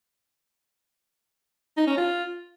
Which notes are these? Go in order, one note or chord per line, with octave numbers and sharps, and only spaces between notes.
D#4
C#4
F4